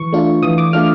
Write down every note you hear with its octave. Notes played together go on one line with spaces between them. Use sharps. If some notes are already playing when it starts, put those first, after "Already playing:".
Already playing: E3 C#6
A3 D4 F4
E3 D#6
D6
A3 D4 F4 F6